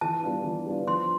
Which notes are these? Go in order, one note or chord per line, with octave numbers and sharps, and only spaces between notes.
E3 A5
G3 B3 D4 F4
E3
G3 B3 D4 F4
F3 C6